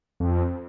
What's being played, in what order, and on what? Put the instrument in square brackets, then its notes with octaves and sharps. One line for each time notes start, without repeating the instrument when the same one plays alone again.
[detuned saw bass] F2